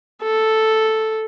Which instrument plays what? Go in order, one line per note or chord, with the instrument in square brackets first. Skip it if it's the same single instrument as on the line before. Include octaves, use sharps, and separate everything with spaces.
[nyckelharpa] A4